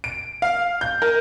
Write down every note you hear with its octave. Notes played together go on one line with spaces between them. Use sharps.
D7
F5
G6
A#4